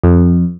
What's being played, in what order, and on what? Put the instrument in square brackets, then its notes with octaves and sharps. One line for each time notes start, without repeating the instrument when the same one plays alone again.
[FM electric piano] F2